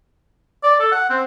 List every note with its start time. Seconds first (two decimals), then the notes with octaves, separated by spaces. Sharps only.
0.63 D5
0.80 A4
0.92 F#5
1.10 C4